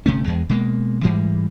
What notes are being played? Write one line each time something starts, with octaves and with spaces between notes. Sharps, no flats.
G1 C3 A3 C#4
E2 G#3
B2 G#3 A#3
G#2 E3 G3 G#3